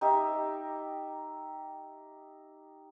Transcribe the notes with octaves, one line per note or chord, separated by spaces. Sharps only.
D#4 G4 D#5 E5